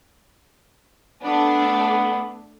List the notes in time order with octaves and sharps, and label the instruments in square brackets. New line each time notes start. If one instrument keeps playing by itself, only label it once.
[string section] A3 D4 [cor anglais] B3